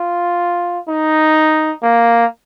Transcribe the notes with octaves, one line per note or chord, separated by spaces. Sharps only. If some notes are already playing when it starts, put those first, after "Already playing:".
Already playing: F4
D#4
A#3